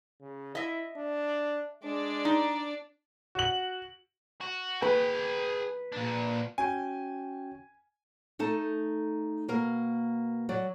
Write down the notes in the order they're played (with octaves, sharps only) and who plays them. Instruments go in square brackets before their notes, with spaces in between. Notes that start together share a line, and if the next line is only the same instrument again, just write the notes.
[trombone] C#3
[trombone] E4 [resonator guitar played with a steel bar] D#5 E5
[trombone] D4
[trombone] G#3 [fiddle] D4 D5
[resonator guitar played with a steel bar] D#4
[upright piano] F#4 F#7
[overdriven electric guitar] F#4
[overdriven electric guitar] G#4 G5 [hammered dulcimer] B4
[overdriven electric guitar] A#2 D4
[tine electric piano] C#4 F#4 G5 [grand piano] G#5
[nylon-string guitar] A3 D#4 A4 A5
B2 A#3 A#4
F#3 D5